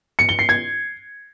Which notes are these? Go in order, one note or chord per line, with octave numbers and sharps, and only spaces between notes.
C#7
G7
C7
G#6